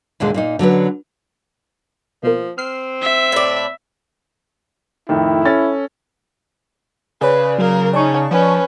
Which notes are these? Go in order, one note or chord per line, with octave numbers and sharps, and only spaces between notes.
D#2 A#2 D3 G#3
A#2 A#3 D#4
D3 F#3 C#4 B4
B2 F3 A#3
C4 F6 C7
E5
A2 D5
F2 A2 D#3 E4
C#4 A4 A6
C#3 B4 C#5 D5 G#5
F#3 A#3 A#4
C#4 D#4 D5 A5 C#6
F3 C#4 B4